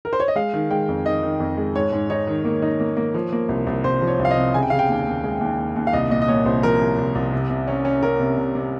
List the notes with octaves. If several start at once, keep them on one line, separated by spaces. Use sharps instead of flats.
A#4
C5
C#5
D#5
G#3 F5
D#3
G#3 G5
F2
D#3 D#5
D#3
F2
G#3
G#2 C#5
G#2
D#4 C#5
D#3
A#3
D#4
A#3
A#3
F3
A#3
C2
C2
C2 C5
F3
C#5
C2
F5
D#5
C3
C#3 G#5
G5
C#3 F5
G5
D#2
D#2
G#3
D#2
D#2
D#2
F5
C2 D#5
A#2 D#5
D#5
A#2 C#5
C2 C5
F3 A#4
C2
C2
C2
C3
C3
C#4
C#4
C#4 A#4
C3
C3
C3